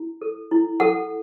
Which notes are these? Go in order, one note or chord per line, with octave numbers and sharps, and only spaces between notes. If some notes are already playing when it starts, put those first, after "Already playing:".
Already playing: E4
A4
E4
A4 F#5